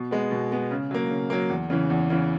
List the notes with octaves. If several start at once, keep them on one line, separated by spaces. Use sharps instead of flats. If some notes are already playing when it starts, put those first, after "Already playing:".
Already playing: B2
G#3 B3
B2
G#3 B3
C#3
F#3 A#3
C#3
F#3 A#3
E2
C#3 E3
E2
C#3 E3